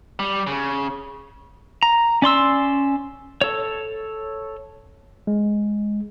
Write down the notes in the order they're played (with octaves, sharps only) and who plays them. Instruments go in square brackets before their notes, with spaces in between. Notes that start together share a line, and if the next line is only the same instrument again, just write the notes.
[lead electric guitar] G3
C#3
[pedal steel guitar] A#5
C#4 D5 C6 E6
A4 C#5
[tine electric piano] G#3